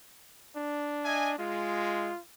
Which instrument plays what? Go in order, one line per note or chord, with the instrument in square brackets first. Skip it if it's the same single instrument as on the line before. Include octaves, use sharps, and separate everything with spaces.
[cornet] D4
[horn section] D#5 E5 G#5
[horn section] G#3 [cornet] F4